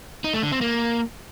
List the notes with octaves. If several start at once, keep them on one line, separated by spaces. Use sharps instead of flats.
D#4
A3
D3
C4
A#3